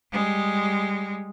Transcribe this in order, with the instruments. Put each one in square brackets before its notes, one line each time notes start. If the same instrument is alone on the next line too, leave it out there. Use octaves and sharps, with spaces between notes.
[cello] G3 G#3